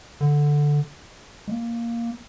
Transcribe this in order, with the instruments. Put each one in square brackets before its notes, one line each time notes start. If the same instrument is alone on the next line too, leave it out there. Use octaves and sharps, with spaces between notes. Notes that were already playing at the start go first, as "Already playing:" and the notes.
[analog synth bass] D3
G#3
A#3